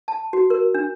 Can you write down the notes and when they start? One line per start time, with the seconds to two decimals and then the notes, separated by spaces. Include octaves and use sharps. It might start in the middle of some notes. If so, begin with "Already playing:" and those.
0.08 A5
0.33 F#4
0.50 A#4
0.74 D4